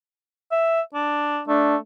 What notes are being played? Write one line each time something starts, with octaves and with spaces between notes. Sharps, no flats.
E5
D4
A3 D4